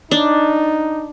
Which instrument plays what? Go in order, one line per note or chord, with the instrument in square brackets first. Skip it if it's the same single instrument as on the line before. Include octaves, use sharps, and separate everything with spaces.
[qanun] D4 [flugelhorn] D#4